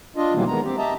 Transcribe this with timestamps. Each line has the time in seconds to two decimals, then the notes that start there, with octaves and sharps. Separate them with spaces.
0.16 D4 F4 D#5
0.34 B2 D#3 E3 F#3 G3 A#3
0.48 D#3 G#3 B3 A#5
0.64 C4 G4
0.78 G4 D#5 E5 A5 A#5